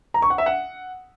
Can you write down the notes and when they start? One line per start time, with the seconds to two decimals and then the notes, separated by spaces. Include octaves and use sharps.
0.14 A#5
0.22 C#6
0.30 F#5
0.38 E5
0.46 F#5